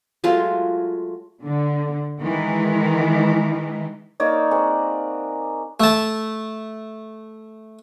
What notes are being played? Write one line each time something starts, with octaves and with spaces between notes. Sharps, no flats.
F#3 G#3 A3 F4
D3
D#3 E3 G#3
A#3 D#4 C#5 D5
C4 G#4 F#5
A3 A5